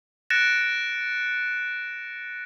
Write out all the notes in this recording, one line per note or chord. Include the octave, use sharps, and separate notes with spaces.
F#6 A6 A#6 C#7 D7 E7